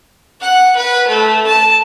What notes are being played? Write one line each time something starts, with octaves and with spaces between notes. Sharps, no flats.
F#5
B4
A3
A5